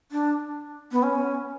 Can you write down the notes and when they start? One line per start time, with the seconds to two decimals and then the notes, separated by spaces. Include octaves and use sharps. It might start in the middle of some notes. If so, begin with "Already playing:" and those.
0.12 D4
0.92 B3
1.03 C#4